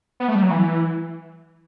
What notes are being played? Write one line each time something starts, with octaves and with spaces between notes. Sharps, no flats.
B3
A3
G3
F#3
E3